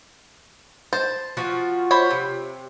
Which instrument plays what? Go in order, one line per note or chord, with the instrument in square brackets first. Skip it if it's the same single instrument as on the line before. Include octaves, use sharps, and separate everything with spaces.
[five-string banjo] C5 [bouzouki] A5
[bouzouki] F3 F4 F#4
[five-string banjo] C5 C#5 B5
[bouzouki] C3